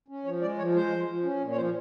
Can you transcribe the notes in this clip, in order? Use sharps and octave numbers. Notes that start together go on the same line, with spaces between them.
C#4
F3 C#5
G#3 D5
F3 C#5
G#3 C5
F3
F3
C#4
A#2
C#5
F3 C5